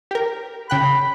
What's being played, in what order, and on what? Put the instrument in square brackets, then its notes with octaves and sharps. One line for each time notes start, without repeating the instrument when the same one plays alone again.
[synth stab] G4 A#4
[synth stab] C#3 G5 F#6 [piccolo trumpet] B5